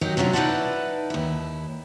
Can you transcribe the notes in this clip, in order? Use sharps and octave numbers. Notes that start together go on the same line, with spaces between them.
F#3 D#4 G4 A#4
C3 F#3 C#4 D4 F4
D#4 E4 B4 D5 F#5 A5
D#2 E4